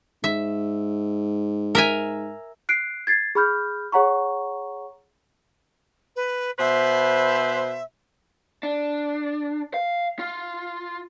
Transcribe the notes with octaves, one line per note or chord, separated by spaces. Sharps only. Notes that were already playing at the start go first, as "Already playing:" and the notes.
G#2 E5
A#4 E5 G#5
F#6 C7 D7
G#6 A6 C7
G#4 B5 F6 G6
G#4 C#5 F#5 A#5 C#6
B4
B2 B4 C5 E5
D4
F5
F4